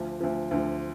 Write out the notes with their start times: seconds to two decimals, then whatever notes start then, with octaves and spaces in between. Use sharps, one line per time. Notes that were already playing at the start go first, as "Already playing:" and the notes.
Already playing: D2 D3 F3
0.21 D2 D3 F3
0.51 D2 D3 F3